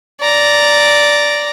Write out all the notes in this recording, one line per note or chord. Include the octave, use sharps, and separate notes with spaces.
D5 A#5